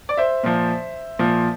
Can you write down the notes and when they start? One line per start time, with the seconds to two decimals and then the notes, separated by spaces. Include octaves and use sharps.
0.09 D5
0.17 C5 E5
0.43 A#2 F3
1.19 A#2 F3